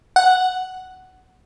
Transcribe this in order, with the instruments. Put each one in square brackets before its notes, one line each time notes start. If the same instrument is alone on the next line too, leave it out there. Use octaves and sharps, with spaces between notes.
[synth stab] F#5